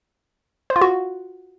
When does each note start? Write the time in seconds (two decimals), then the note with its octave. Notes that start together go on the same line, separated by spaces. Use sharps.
0.70 C5
0.76 F4
0.81 F#4